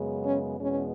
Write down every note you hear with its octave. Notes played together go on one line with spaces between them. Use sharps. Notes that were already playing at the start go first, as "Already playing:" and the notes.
Already playing: F#2 C#3 G#3 B3
C#4
E2 B2 G#3 B3 C#4